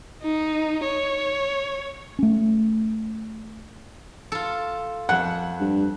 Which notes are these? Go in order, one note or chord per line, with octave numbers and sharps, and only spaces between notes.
D#4
C#5
A3 C#4
F4 A4
F2 F#5
G2